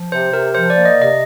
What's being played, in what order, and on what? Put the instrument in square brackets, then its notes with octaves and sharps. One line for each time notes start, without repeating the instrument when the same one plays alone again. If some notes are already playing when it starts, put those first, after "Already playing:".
Already playing: [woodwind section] F3
[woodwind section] C3 [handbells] C5
[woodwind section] C3 [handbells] A#4
[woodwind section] F3 [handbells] C5
[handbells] D5
[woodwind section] A#3
[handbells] D#5
[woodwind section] C3
[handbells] D#5